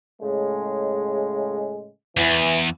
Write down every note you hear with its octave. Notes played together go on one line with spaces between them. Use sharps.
A2 C#3 G#3
E2 E3